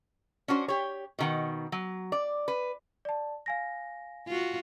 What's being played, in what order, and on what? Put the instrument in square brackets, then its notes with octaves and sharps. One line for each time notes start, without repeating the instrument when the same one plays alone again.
[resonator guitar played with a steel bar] C#4 D4 F#4 C5
G4 C#5
B2 D#3 F#5
F#3
D5
B4
[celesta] D5 A5
F5 G#5 A#6
[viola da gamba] F4 F#4